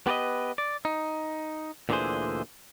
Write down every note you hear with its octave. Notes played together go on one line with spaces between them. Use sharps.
B3 G4 B4 D5 D#5
D5
D#4
D2 A#2 D3 E3 G#4 C5